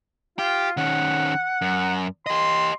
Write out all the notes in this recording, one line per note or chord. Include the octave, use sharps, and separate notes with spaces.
F4 G4
D#3 C#4 F#5
F#2
G4 D#5 C6